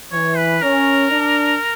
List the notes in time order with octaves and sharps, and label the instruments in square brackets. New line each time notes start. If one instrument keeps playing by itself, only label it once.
[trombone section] E3 [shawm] C#5
[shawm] B4
[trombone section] C#4 [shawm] A#4
[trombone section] D4